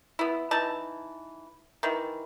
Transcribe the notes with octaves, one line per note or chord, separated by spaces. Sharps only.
B3 E4
E3 D#4 A5
D#3 E3